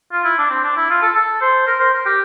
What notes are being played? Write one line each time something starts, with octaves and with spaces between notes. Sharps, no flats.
F4
E4
D4
C4
D4
E4
F4
A4
A4
C5
A#4
C5
A#4
G4